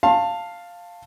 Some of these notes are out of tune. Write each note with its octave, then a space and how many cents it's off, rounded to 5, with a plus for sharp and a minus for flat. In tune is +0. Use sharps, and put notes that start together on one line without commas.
F5 +0 A5 +15 C6 +40